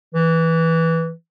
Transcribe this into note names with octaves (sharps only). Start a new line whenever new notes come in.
E3